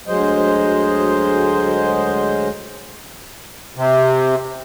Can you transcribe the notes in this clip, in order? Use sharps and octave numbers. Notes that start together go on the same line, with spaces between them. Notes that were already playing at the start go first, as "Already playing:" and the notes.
D2 F#3 G#3 C5 D#5
C3